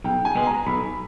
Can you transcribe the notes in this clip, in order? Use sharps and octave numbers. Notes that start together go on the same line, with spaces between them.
B1 G5
G#5
B2 G#3
A#5
B1 B5